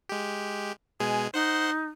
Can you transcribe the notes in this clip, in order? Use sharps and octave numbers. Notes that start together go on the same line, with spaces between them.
G#3 G4
B2 G#3 G#4 G#5
D#4 C5 F#5 C6